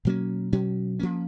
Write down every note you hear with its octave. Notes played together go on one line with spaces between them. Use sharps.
B2 F#3 A#3 C#4
B2 F#3 C#4
F3 A#3 C#4